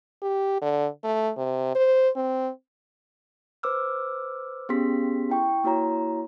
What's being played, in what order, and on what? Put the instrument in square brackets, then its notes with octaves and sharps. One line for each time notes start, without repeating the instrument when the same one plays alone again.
[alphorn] G4
D3
A3
C3
C5
C4
[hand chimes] B4 C5 D6 E6 F6
B3 C#4 G4 G#4 C6 B6
E4 G5 C#6
A#3 E4 F#4 C#5 A#5